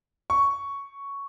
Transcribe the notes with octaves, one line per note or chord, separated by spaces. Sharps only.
C#6